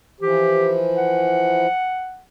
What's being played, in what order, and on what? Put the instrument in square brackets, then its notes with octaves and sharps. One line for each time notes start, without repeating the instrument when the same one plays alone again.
[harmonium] E3 F3 [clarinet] G4
[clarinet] F#5